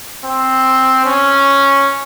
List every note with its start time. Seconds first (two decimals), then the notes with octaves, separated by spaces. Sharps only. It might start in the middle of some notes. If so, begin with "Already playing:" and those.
0.25 C4
1.05 C#4